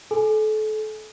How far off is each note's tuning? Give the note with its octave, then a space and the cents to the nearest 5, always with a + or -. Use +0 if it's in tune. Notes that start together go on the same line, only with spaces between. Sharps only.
A4 -30 G#5 +15